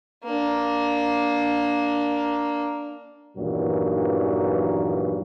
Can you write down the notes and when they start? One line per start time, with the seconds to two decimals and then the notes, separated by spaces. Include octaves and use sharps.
0.24 A#3 D4
3.37 E2 G2 A#2 D#3 E3 F#3